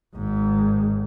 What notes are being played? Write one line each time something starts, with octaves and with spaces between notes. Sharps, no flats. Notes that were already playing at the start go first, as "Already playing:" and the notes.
G#1 G#2